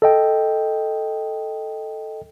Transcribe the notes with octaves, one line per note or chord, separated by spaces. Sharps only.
A4 D#5 G5